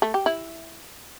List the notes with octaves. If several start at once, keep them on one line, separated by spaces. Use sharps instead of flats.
A3
G4
E4